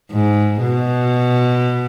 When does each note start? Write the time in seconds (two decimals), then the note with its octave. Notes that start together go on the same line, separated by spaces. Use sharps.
0.12 G#2
0.61 B2